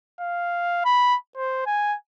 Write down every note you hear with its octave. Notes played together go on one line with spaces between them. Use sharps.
F5
B5
C5
G#5